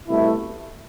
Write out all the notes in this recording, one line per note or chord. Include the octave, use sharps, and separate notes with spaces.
C2 B2 A3 E4